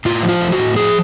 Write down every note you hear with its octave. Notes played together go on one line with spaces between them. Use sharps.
A2 F4
F3
F4
A3
F#4
A2
F3 G#4